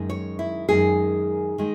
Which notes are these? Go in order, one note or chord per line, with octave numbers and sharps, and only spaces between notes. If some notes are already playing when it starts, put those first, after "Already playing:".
Already playing: F#2 D#3 G#3 C#4
C#5
E4
F#2 D#3 G#3 C#4 G#4
D#3 G#3